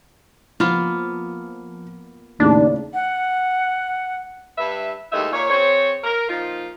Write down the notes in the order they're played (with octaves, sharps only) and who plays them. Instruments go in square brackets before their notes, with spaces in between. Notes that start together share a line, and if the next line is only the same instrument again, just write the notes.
[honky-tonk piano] F3 [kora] A#3 B3 F4
[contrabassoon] D#2 [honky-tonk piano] A2 C#3 [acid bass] D4
[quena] F#5
[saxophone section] G2 B4 E5
D#2 E3 G#3 A3 D#4 E5
A#2 C#5
C4 G#4 C5 C#5
A#4
A#2 F3 D#4 F4